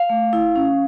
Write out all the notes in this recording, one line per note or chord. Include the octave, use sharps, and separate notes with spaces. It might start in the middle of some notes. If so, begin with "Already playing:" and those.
Already playing: F5
A3
E4
C#4